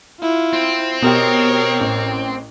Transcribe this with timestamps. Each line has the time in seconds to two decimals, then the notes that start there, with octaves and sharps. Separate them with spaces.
0.20 E4 F4
0.53 C4
1.02 B2 G4 A#4 C#5
1.80 A1